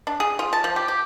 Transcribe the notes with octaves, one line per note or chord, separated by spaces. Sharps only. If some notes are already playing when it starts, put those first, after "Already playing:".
D4
G#4
F4
A5
F3
G4
G4